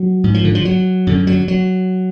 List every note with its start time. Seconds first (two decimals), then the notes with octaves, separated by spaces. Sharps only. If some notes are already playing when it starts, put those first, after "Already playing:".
Already playing: F#3
0.24 G#2
0.34 F3
0.44 D3
0.55 F3
0.65 F#3
1.07 F#2 D3
1.27 F#3
1.48 F#3